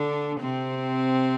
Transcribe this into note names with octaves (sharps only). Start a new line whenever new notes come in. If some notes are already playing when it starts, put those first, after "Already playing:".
Already playing: D3 D4
C3 C4